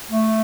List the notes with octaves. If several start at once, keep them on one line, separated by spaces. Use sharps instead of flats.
A3